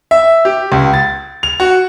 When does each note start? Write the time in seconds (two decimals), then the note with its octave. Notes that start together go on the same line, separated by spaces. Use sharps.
0.11 E5
0.45 G4
0.72 C#2
0.94 A6
1.43 F7
1.60 F#4